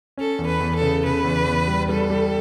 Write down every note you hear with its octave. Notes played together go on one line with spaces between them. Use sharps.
C#4 A4
E2
B4
E2
A4
C#3
C#3 B4
E2
E2
G3
G3 A4
G3